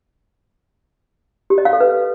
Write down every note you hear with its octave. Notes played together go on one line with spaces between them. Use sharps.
G4
D#5
F5
A4
B4